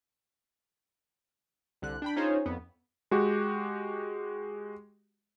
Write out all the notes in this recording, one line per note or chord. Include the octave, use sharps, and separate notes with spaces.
C2 D3 F#6
D4 G5 B5
C#4 D#4 F4 G#4 C5 C#5
F2 B3
G#3 F#4 G4